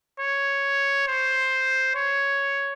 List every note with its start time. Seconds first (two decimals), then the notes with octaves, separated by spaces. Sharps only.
0.20 C#5
1.08 C5
1.96 C#5